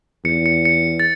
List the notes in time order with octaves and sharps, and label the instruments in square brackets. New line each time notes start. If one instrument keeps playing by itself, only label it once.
[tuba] E2 [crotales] C#7
[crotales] C#7
C#7
A6